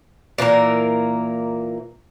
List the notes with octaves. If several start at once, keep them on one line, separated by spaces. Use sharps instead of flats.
A#2 E3 A#3 A#4